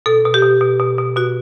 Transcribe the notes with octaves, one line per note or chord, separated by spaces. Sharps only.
B2 A4
B2
G4
B2
B2
B2
B2
B2 F#4